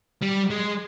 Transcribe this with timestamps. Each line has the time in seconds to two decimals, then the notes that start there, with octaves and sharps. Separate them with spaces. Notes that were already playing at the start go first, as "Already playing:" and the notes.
0.22 G3
0.50 G#3